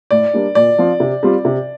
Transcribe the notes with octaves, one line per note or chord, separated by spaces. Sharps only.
A2 D5
G3 A#3 D4
A#2 D5
F3 C4 F4
C3
G3 C4 F4
C3